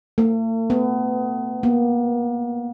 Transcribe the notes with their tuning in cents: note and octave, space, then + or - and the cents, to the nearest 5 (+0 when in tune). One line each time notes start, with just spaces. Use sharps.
A3 +45
B3 +30
A#3 +45